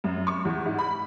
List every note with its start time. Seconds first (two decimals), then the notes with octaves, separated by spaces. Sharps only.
0.04 F#2
0.27 C#6
0.45 E2
0.66 G#2
0.79 B5